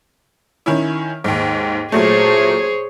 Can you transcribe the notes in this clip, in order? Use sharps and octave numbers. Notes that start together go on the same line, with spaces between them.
D#3 C#4 E4
D#2 G#2
A#2 F#3 A3 G#4 C5 C#5